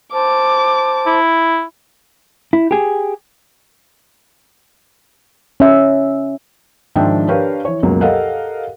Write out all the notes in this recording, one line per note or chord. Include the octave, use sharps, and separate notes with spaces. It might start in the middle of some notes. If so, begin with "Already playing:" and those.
C5 A5 D6
E4
E4
G4 G#4
C#4 E5
G#2 D#3 F3 D4 E5 G5
D4 G4 A#4 B4 C#5 F5
E3 C#5
C#2 F#2 B2 F#3 A#3
G4 A4 A#4 D#5 F5 F#5